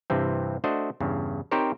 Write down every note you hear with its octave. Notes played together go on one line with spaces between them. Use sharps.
G2 C3 E3 C4
A3 D4 F#4 C5 D#5
E2 G2 C#3
C4 D#4 G4 A#4 C5 C#5